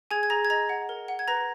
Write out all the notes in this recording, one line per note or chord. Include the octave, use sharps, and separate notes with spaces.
G#4 G#5 G#6
G#6
G#4 A#5 A#6
G#6
D#5 A#5 A#6
F#5
A#4
F#5
G#6
B4 A#5 A#6